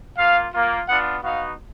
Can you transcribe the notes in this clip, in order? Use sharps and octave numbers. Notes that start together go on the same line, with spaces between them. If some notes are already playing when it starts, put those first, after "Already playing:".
A#3 F4 F5
A#3 F4
B3 D4 F4 F#5
B3 D#4 F#4 F5